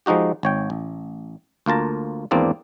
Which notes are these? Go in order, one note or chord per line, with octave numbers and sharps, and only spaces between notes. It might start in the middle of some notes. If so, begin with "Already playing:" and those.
F3 G#3 D#4 F#4 G4
G#1 C#5 G5
A1
D2 A#3 F4 A5 A#5
G#1 E2 A#3 C4 D4 D5